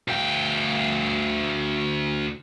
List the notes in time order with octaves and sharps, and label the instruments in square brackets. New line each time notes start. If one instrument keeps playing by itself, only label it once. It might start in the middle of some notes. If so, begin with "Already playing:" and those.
[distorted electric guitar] D2 G5